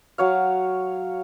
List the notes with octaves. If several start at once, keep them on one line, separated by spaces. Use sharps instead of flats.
F#3 C#5 F5